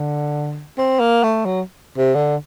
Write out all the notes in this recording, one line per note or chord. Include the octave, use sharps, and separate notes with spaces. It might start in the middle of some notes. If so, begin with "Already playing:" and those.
Already playing: D3
C4
A#3
A3
F#3
C3
D3